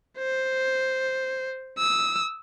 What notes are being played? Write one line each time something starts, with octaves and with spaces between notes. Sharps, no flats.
C5
D#6 E6